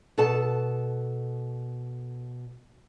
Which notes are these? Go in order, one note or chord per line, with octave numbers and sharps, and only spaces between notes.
B2 A4 A5